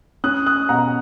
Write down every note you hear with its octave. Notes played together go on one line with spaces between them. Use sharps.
C#4 D#6 F#6
D#6 F#6
B2 F#5 A#5